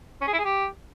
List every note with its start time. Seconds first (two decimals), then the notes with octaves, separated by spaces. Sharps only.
0.22 C#4
0.27 G#4
0.33 E4
0.39 G#4
0.45 G4